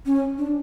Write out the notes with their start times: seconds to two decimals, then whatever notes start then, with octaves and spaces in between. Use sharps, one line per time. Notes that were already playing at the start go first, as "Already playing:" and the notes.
0.06 C#4
0.38 D4